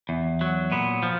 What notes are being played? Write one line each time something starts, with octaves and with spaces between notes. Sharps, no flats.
E2
F#3
A#2 B3
F3